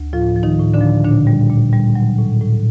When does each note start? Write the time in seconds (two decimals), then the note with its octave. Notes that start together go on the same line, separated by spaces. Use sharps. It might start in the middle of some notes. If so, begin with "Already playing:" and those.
Already playing: D2
0.13 A2 F3 F4
0.36 F3
0.43 D#3 D#4
0.59 A2
0.74 D3 D4
0.81 F3
1.04 A#2 D3 D4
1.27 G3
1.50 A#2
1.73 G3
1.95 F#3
2.18 A2
2.41 A2